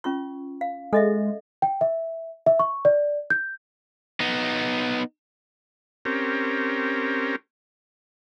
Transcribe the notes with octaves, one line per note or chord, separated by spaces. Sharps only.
C#4 F4 C#6
F5
G#3 A4 D#5 E5
G5
E5
E5
C#6
D5
G6
B3 D#4
C4 C#4 G4 A#4